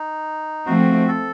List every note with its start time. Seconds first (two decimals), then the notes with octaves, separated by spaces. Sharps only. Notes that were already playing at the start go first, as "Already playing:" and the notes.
Already playing: D#4
0.66 F3 A3 C4 F#4
1.08 A4